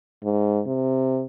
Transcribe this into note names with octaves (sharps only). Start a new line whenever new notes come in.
G#2
C3